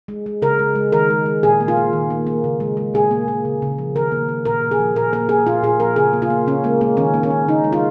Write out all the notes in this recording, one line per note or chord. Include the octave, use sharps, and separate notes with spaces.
G#3
G#3
C#3 A#4
G#3
G#3
D#3 A#4
G#3
G#3
A#2 G#4
A#3
F4
A#3
D#3
A#3
A#3
C#3
G#3
G#3
A#2 G#4
A#3
A#3
C#3
C#3
F3
D#3 A#4
A#3
A#3
A#2 A#4
A#2
G#4
F3
A#2 A#4
A#3 A#4
A#3 G#4
A#2 F4
A#2 G#4
F3 A#4
C#3 G#4
A#3
F4
A#3
C#3 C#4
G#3 A#3
G#3 A#3
D#3 C#4
A#3
C#4
A#3
C#3 D#4
G#3
F4